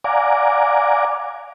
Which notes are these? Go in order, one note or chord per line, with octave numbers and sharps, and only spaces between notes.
D5 F5 F#5 G#5 A#5 D6